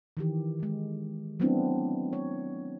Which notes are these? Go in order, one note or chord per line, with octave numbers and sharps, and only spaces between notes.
D#3 E3 G4
E3 G#3
F#3 A3 B3 C4 D4 E4
C#5